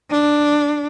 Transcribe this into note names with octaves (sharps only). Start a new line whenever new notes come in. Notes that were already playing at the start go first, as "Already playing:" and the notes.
D4